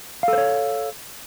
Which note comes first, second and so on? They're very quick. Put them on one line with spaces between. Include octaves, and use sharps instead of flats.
F5 A4 C5 C#5